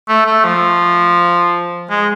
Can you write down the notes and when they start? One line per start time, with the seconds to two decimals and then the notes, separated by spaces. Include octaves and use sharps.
0.08 A3
0.26 A3
0.44 F3
1.90 G#3